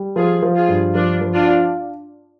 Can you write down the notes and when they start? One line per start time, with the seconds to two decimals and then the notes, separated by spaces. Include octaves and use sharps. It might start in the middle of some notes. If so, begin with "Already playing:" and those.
Already playing: G3
0.16 F3 F4 G#4
0.43 F3
0.56 F4 G#4
0.68 G2
0.94 F3 D4 F4
1.21 F3
1.34 D4 F4
1.48 F4